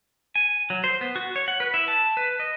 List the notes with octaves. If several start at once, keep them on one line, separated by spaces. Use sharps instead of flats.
G#5
F#3
C5
B3
F#4
C#5
F#5
B4
E4
A5
B4
D#5